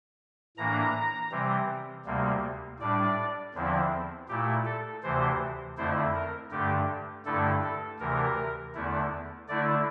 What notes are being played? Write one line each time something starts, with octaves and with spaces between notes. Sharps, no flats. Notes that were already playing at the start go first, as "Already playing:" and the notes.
A2 E3 A#3 D4 A#5
C3 E3 G3 C4
D2 C3 G3 A#3
A2 G3 D4 D5
E2 D3 F3 C4 E4
A#2 A3 E4 G4
A4
D2 C3 E3 C5
F2 D3 A3 E4 C5
A#4
G2 D3 A3 G4
G2 D3 A3 E4 A4
A4
D2 C3 E3 A#4
E2 D3 A3 E4
D3 A3 E4 D5